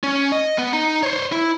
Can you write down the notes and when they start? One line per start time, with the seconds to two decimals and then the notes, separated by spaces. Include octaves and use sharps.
0.03 C#4
0.32 D#5
0.58 B3
0.73 D#4
1.03 C5 C#5
1.32 E4